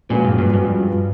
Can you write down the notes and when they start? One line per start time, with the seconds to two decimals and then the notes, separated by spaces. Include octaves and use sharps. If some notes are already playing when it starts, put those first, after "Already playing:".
0.10 A#2 F3 G#3 C#4 F#4 B4
0.25 G2
0.38 G2
0.53 G2 F3 G#3 C#4 F#4 B4